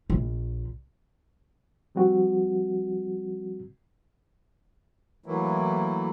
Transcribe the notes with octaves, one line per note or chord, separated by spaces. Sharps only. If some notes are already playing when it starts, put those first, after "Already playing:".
A#1
F3 G3 C4 F#4
E3 F#3 A3 A#3 E4